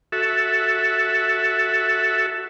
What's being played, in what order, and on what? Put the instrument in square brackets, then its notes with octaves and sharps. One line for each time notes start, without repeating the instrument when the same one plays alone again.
[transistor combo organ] F#4 A4 E5